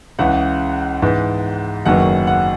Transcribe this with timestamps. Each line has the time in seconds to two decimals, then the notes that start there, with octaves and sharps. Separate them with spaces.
0.19 C#2 C#3 E3 F#5
1.02 G#2 E3 B3
1.85 F#1 F#2 D#3 F#3 B3 F#5
2.27 F#5